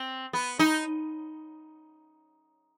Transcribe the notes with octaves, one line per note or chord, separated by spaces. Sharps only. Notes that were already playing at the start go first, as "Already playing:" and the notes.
Already playing: C4
B3
D#4